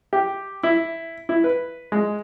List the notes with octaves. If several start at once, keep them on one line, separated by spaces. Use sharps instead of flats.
G4
E4
E4
B4
G#3